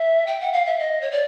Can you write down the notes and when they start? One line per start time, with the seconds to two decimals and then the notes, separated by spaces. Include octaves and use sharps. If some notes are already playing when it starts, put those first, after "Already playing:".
Already playing: E5
0.27 G5
0.40 F#5
0.53 F5
0.66 E5
0.79 D#5
1.01 C#5
1.11 D5